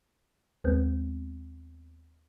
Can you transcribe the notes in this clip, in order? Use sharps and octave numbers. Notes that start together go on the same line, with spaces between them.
D#2 G#3 B3 C4